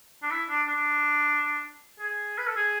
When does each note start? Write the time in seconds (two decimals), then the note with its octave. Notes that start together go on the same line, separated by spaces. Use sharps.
0.23 D4
0.31 E4
0.49 D4
0.68 D4
1.99 G#4
2.38 B4
2.47 A4
2.56 G#4